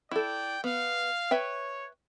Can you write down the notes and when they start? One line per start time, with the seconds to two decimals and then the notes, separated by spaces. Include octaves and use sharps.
0.11 E4 A4 D5 G5
0.64 B3 F5
1.31 B4 C#5 E5 G5